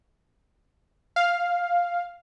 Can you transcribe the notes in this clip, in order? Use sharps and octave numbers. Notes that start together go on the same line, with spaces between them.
F5